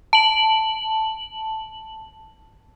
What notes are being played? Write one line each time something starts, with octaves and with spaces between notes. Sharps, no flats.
A5 F#7